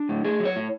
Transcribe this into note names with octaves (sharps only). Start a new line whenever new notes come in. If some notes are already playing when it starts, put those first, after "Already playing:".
Already playing: D4
A2
A3 G#4
F#3
C#5
A2